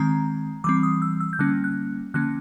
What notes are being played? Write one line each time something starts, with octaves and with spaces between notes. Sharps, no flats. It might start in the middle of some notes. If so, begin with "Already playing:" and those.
Already playing: D#3 G#3 C4 A#5
E3 G3 C4 D6
D#6
E6
E6
G6
D3 G3 A#3 C#4 F#6
F#6
D3 F3 A#3 C#4 F#6